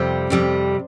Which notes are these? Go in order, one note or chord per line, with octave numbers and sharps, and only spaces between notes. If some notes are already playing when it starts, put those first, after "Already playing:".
Already playing: F2 C3 G3 C5
F2 C3 G3